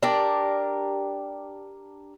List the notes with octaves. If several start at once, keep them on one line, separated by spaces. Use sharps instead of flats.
D4 G4 A#4 D5